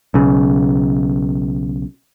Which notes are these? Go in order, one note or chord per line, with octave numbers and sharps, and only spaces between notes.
B1 C#3